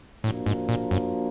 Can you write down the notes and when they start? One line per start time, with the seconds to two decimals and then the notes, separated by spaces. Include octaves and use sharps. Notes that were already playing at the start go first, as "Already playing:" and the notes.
0.24 A2 F3 A#3 D4 F#4
0.46 G#2
0.69 A#2
0.91 F#2